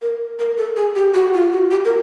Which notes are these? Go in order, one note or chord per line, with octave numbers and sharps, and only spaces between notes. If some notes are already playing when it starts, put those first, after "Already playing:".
A#4
A#4
A4
G#4
G4
F#4
F4
F#4
G4
A#4